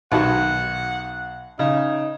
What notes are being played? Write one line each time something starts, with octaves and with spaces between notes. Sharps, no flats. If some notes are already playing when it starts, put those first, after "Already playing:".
B1 D#3 F#4 F#5
C#3 D#4